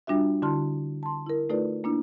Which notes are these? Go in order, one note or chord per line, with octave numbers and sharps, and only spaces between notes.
G3 D4 F4 F#4 E5
D3 E4 F#4 A5 C6 F6
A5 C6
E4 A#4
A3 D#4 F4 A4 B4 D5
A#3 D4 E4